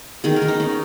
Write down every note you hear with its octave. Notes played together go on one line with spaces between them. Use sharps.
D#3 G#4
A#4
D#3
D#4
D#3 C#4